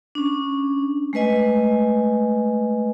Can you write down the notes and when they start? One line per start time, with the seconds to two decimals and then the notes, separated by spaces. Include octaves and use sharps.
0.15 C#4 D4
1.13 G#3 A3 B4 D#5 G#5